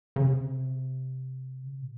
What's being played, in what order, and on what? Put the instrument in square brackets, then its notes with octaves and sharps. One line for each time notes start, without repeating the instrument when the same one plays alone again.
[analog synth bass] C#3
C3
C#3
C3
A#2